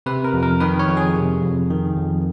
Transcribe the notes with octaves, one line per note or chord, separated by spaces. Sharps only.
C3 B4
A#4
F2
A#4
D#3 B4
C#5
F2
G#4
C3
F2
D#3
F2